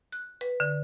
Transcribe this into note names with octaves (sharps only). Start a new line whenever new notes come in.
F#6
B4
D3